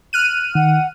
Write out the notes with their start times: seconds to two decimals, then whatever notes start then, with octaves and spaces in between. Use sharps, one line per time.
0.13 F6 F#6 D#7
0.55 D#3 F#5